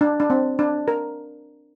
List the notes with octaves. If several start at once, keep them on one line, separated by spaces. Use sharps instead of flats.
D4
D4
C4
D4
A#4